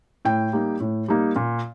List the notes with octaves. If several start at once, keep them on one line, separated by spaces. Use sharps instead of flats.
A2 G5
G3 A#3 D#4
A2
G3 A#3 D#4
A#2